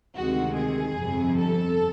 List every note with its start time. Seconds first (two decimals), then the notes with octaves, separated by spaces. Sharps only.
0.15 D2 C3 D#3 G#3 F#4
0.56 G#4
0.96 G1 F2 C3
1.37 A4